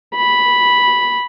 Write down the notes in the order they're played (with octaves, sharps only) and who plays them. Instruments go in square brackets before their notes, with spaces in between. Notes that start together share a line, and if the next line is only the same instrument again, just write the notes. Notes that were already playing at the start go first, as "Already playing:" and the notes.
[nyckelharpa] B5